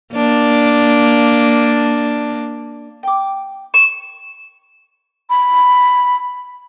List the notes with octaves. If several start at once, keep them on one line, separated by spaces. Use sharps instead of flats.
A#3 D4
G5 D6
C#6 E7
B5